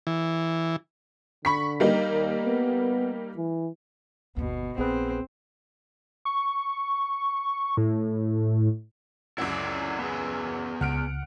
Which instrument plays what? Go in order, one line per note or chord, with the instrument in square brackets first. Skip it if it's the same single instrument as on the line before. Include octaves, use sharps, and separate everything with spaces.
[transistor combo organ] E3
[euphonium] D3 [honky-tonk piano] B5 C#6 B6
[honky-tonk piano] G3 A#3 D#4
[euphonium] D#2
B3
E3
[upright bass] G1 D#2 [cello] B2
[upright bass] A#1 [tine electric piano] B3 G#4 B4 [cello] C4
[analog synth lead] C#6
A2
[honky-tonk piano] C#2 F#2 F#3 [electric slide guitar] E4 D5
[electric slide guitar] B3 G#4
[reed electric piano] C#2 [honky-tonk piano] F#5 F6 D7